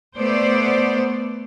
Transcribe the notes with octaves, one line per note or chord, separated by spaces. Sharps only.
A3 B3 C5 D5